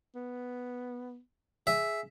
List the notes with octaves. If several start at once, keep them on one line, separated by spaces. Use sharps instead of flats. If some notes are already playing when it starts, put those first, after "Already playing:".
B3
G#4 E5